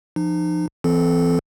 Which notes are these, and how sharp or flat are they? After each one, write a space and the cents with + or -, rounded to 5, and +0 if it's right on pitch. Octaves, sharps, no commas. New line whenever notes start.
F3 -20 D#4 -35
E3 +20 C4 -30 A4 -15